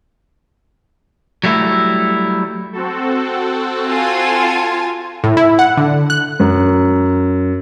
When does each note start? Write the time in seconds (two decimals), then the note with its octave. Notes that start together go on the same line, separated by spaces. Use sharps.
1.44 F#3 G3 A3 E4
2.73 C4 F#4 A4
3.87 F4 G#5 A5
5.24 A2
5.37 E4
5.59 F#5
5.77 D3
6.10 F#6
6.40 F#2